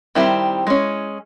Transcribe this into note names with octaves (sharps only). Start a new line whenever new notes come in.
D#3 G3 C4 E4
G#3 C#4